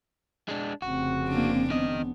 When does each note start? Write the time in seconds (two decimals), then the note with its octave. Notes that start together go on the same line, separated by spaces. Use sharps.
0.49 G#3 D4
0.82 F1 C#3 C4 F#4
1.28 A#3 D4
1.70 D#3 B3 D#5